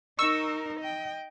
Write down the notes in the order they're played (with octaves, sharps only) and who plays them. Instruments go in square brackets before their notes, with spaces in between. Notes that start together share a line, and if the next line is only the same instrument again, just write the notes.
[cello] D#4 A#4 [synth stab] C#6 E6
[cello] D#5 G5